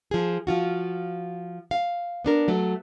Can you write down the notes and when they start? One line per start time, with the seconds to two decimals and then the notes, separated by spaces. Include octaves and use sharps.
0.11 F3 G#4
0.47 F3 F4 F#4
1.71 F5
2.25 B3 D4 A#4
2.48 F#3 A3